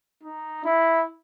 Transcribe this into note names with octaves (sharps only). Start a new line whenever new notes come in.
D#4
E4